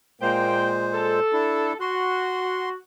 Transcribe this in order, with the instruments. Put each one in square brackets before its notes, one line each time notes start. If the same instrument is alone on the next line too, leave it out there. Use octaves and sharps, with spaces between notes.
[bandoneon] A#2 G#3 C5 [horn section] A#3 G5
[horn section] A4
[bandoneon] D4 E4
[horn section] F#4 [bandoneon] C6